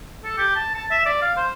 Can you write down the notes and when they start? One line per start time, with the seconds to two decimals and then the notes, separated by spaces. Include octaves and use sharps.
0.24 A4
0.38 G4
0.56 A5
0.74 A5
0.91 E5
1.05 D5
1.22 F5
1.37 C5